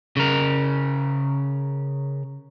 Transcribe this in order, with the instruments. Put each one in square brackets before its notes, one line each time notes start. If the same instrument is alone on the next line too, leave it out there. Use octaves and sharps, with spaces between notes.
[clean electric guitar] C#3 A#4